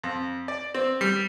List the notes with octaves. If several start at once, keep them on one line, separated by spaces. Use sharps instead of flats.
F2
D5
C4
G3